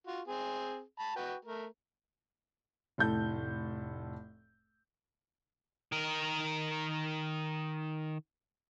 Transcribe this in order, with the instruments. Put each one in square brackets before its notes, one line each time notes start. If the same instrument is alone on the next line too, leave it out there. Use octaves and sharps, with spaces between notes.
[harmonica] F4 F#4
C4 G#4
A5 B5
F#4 B4 G5
A3 A#4
[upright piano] F1 A2 A4 G6
[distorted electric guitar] D#3 A#4